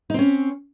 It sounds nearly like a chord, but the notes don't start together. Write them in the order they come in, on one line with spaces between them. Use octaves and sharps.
D#4 C4 C#4